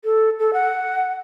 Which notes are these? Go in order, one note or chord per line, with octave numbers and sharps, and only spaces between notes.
A4
A4
F#5